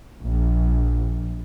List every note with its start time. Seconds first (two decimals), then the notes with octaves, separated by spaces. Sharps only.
0.20 A#1